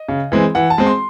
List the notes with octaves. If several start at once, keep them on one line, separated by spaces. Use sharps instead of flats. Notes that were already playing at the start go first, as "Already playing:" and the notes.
Already playing: D#5
C#3
E3 G#3 C4
E3 F#5
A5
G#3 C4
C6